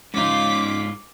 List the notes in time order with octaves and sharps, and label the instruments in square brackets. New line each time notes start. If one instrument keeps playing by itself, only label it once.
[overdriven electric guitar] G#2 F4 [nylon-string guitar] C#4 D#4 [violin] D6 B6